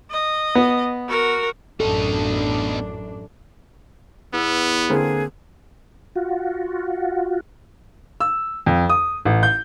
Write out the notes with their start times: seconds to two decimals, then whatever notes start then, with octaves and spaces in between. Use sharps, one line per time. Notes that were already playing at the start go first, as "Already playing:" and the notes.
0.11 D#5
0.55 B3
1.08 F#4 A#4
1.80 A1 F#2 B2 D4 D#4 A4
4.33 E2 B3 E6
4.89 D3 A#3 C4 G#4
6.15 F4 F#4
8.20 E6
8.66 F2
8.90 D#6
9.25 A1
9.43 G6